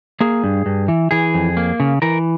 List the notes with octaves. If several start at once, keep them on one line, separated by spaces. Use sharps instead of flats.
A#3 G#4
G2
G2
E3
E3 G#4
F2
A#3
C#3
E3 A#4